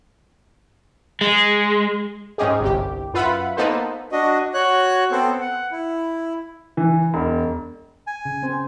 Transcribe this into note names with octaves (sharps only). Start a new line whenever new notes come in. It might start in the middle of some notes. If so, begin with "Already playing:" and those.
G#3
G#2 C#4 D#4 G4 G#4
G1 C2 G4
F#2 F4 B4 E5 F#5 B5
A#3 B3 D#4 A4 B4 C5
D4 F#4 D#5
F#4 C#5 F#6
B3 C4 A4 C5
F#5
E4
E3
E1
G#5
C#3
C4 C5